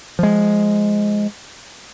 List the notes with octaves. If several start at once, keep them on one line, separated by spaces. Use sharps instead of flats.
F3 G#3